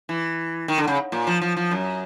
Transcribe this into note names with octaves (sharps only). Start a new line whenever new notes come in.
E3
D#3
D3
C#3
A#2
F3
F3
F3
F#2